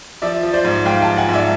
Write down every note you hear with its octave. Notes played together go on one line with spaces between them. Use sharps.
F3 D5 E5
F3
C5 D5
G#2
G#2 F5 G5
G5 A5
F3
F#5 G#5
G#2
D5 E5